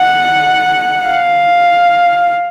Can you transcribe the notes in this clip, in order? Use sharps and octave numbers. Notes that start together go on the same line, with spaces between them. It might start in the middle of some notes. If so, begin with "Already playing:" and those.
Already playing: F#5
F5